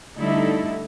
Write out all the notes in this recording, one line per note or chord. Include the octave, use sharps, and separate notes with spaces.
D3 G3 A3 D#4 E4 A4